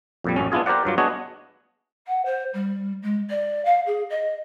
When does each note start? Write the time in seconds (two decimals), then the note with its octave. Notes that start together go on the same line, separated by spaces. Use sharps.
0.24 F2 A#2 G3
0.36 A1 F#2 C#4
0.52 B3 D4 E4 F4 G#4
0.66 G4 A#4 C5 D5 F#5
0.85 G2 F#3 F4
0.98 B3 D4 F#4 G#4 C#5 D#5
2.07 F#5
2.25 C5
2.53 G3
3.02 G#3
3.29 D5
3.65 F5
3.86 G#4
4.09 D#5